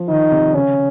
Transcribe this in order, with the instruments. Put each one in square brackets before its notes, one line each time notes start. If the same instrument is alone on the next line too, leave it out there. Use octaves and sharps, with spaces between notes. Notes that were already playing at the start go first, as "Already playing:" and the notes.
Already playing: [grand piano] F3
[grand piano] D#3 [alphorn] D#4
[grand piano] C3
[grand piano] C#3 [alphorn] C#4